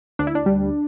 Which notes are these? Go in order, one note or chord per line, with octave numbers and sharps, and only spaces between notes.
D2 D4
E4
D4
G3